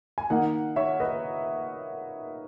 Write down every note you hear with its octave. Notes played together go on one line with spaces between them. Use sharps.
G#5
D#3 A#3 D#4 D#5 F#5
C#5 E5
B4 D#5